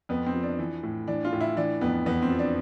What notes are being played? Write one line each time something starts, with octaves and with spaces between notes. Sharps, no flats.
F2 B3
C4
F3
D4
E3
A2
E3 D4
F4
A2
E4
E3 D4
F2 B3
E2 B3
C4
F3
D4